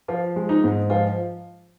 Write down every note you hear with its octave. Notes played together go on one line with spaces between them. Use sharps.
F3 F4
G#3
D#4
G#2
F3 F4